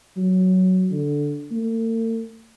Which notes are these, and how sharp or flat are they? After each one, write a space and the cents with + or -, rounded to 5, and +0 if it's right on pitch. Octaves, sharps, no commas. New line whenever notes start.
F#3 +5
D3 -5
A3 +45